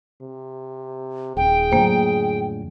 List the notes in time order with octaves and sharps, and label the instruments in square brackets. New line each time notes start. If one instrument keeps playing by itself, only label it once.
[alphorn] C3
[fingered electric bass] D#1 [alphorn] G#4 [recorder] G5
[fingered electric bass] F2 A2 D3 [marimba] F#3 A#3 C5